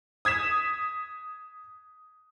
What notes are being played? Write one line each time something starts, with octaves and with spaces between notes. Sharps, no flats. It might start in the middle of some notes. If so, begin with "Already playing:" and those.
D#6 G#6 B6 E7